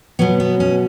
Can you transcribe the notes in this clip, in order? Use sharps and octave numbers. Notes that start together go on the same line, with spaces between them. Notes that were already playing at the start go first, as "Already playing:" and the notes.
B2 F#3 B3
B3
C#4